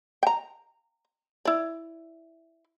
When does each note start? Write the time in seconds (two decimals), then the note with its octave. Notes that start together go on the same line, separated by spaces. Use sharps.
0.23 G5 A#5
1.45 E4 D5